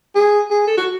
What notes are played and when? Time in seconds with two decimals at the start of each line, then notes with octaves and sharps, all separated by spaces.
0.15 G#4
0.50 G#4
0.67 A4
0.77 F#4